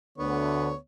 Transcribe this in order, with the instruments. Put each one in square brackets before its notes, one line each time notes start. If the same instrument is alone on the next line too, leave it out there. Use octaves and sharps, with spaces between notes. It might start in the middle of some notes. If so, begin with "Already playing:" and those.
[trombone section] D2 D3 [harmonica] B3 C#5